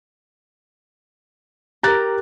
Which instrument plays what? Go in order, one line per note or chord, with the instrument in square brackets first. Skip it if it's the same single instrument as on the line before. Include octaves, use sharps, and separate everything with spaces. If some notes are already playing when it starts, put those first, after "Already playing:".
[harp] G4 A#4 [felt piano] A#5 F#6 A6